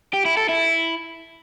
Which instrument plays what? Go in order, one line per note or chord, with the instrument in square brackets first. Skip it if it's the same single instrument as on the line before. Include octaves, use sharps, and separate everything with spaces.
[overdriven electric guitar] G4
E4
A4
E4